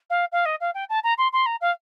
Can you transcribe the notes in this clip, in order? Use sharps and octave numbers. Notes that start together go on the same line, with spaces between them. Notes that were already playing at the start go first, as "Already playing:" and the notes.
F5
F5
D#5
F5
G5
A5
A#5
C6
C6
A#5
F5